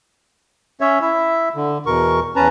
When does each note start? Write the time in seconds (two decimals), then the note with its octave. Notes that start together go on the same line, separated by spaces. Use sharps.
0.81 C#4 C#5 E5
1.01 E4 E5
1.55 D3
1.86 E2 B2 A#4 C#6
2.36 E2 C#4 B4 A5 A#5